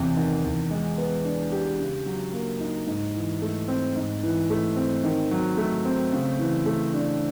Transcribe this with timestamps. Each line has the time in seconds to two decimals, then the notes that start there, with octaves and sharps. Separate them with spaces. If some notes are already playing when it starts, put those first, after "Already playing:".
Already playing: E2 C3
0.16 D#3
0.44 E2
0.71 G#3
0.97 B3
1.25 D4
1.52 G4
1.79 C#3
2.06 F#3
2.33 A#3
2.60 D#4
2.87 G#2
3.15 E3
3.42 A3
3.68 C4
3.96 G#2
4.23 E3
4.50 A3
4.76 C4
5.04 D#3
5.31 F#3
5.57 A3
5.85 C4
6.12 C#3
6.39 E3
6.66 A3
6.94 D4